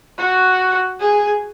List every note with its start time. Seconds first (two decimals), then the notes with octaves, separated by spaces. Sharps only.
0.18 F#4
0.99 G#4